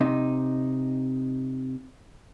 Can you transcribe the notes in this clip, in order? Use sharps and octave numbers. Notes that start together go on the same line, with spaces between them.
C3 D#4